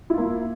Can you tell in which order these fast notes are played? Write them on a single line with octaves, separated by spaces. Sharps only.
E4 F4 A#3